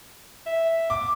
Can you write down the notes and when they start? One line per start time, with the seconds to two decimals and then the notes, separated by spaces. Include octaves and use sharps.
0.46 E5
0.90 D6